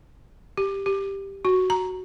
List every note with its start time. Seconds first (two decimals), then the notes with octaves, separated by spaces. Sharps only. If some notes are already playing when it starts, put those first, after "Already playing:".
0.57 G4
0.86 G4
1.45 F#4
1.70 A#5